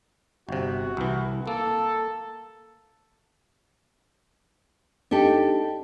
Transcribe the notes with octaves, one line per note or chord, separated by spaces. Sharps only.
G1 C3 F#4
C2 E3
A#3 A4
D4 D#4 G4 A4